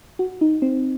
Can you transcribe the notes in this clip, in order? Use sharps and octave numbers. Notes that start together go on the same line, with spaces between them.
F#4
D#4
C4